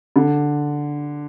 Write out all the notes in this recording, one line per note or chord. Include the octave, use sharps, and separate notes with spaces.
D3